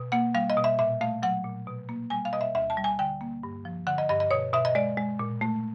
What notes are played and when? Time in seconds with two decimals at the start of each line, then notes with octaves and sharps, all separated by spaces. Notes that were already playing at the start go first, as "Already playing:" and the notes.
Already playing: B2
0.12 A#3 F#5
0.34 G3 F5
0.50 D#5
0.57 B2
0.64 E5
0.79 A#2 E5
1.01 A3 F5
1.23 F#3 F#5
1.44 A#2
1.67 B2
1.89 A#3
2.10 G3 G#5
2.25 F5
2.33 B2 D#5
2.41 E5
2.55 D2 E5
2.70 A5
2.77 G3
2.84 G#5
2.99 D3 G5
3.21 A#3
3.43 G2
3.65 F3
3.87 D3 F#5
3.98 D#5
4.09 G2 D#5
4.20 D#5
4.31 B2 C#5
4.53 B2 E5
4.65 D#5
4.75 G#3 D5
4.97 G#3
5.19 A#2
5.41 A3